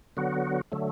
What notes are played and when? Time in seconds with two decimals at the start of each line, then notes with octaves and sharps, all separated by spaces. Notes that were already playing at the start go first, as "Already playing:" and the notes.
0.17 D3 F#3 B3 F#4
0.72 D3 F#3 A3